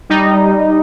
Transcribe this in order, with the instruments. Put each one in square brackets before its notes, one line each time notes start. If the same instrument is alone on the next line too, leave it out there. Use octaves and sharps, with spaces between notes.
[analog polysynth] G3 D#4